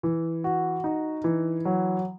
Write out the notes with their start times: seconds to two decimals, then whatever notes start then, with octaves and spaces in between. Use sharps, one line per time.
0.03 E3
0.44 F#4
0.84 D#4
1.24 E3
1.65 F#3